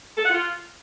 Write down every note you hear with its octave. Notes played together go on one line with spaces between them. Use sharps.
A4
F#5
F4